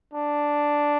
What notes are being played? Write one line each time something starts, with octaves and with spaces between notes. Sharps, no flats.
D4